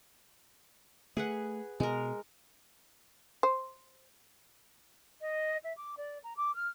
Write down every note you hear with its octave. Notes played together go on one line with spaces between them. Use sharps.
A3 G#4 B4 F#5
B2 G#3 A#4
C5
D#5
E5
D6
D5
A#5
D6
F6